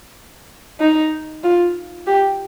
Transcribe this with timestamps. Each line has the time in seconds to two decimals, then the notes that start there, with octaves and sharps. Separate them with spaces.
0.80 D#4
1.44 F4
2.07 G4